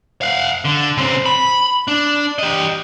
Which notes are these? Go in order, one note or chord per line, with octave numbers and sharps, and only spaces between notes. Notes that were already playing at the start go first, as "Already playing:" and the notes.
F5 F#5
D3
C#3 C4
B5
D4
G4 D#5